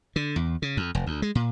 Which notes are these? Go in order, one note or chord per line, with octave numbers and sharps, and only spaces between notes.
D3
E2
C#3
F2
F1
D2
G#3
A#2